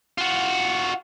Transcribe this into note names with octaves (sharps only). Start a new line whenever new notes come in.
F4 F#4